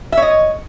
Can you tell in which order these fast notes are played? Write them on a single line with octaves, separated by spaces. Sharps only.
E5 C#5 D#5